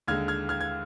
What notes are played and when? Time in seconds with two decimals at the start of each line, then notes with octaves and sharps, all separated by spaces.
0.07 D#2 D3 G#3 F6 G#6
0.28 F6 G#6
0.49 F6 G#6
0.61 G#6